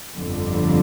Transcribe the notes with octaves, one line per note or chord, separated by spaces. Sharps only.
G1 F2 D3